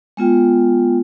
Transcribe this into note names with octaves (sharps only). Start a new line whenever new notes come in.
G#3 B3 F4 G5